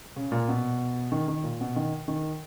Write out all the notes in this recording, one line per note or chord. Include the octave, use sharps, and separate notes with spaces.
C#3
A#2
B2
D#3
D#3
A#2
B2
D#3
D#3